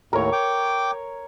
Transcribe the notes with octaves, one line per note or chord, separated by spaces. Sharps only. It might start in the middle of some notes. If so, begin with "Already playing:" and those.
D#2 A2 A#4 C#5
G5 D6